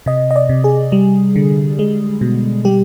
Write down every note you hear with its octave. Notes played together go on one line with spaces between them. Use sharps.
C3 D#5
D#5
D5
C3
G#4
G3
D3
G#3
B2
G3 G4